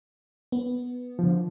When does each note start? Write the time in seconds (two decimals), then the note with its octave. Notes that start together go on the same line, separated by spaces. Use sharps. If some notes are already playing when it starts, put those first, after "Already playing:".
0.52 B3
1.19 D3 F3